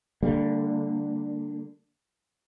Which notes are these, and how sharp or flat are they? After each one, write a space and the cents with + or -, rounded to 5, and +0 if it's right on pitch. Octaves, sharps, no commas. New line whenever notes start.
D3 +0 G3 +0 A#3 -35